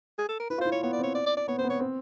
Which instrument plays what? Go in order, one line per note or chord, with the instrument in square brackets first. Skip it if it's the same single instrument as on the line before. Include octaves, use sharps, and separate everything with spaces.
[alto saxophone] G#4
A4
A#4
[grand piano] E4 [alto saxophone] B4
[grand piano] F4
[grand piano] E4 [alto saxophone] C5
[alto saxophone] C#5
[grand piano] B3 [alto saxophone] C#5
[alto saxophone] D5
[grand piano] C4 [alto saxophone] C#5
[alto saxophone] D5
D5
D5
[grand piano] B3 [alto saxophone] C#5
[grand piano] C4 [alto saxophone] C5
[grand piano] B3
[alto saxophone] C#5
[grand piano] C4